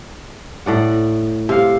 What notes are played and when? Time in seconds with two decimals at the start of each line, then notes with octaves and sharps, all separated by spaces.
0.66 A2 D5 F#5
1.49 C3 F5